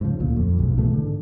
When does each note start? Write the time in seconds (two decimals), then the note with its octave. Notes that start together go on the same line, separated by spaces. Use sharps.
0.01 G#2 C#3 F3
0.20 D2 A#2
0.37 F2
0.59 B1 G#2
0.77 G#2 B2 E3 A3
0.91 G#2 D3